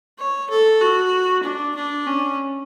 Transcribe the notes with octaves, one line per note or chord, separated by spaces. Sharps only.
C#5
A4
F#4
D4
D4
C#4